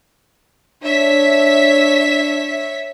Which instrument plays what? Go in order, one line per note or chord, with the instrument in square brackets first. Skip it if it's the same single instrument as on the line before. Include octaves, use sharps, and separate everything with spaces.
[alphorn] D4 [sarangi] C#5 [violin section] E5 B6